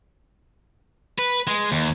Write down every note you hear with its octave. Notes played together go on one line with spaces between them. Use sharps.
B4
G#3
D#2